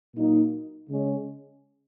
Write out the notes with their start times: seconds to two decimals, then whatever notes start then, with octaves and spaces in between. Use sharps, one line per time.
0.16 A#2 F#3 A#3 D#4
0.89 C#3 G#3 C#4